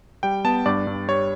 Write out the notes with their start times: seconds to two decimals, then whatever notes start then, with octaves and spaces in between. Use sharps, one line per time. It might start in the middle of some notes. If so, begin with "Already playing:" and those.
0.23 G3 G5
0.45 B3 A5
0.66 G2 D5
0.87 G2
1.08 G3 C#5